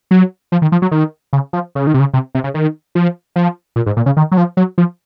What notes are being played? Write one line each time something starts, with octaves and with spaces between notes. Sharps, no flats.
F#3
F3
D#3
F3
F#3
D#3
C#3
F3
C#3
D#3
C3
C#3
C3
C3
C#3
D#3
F3
F3
A#2
G#2
A#2
C#3
D#3
F#3
F3
F#3
F3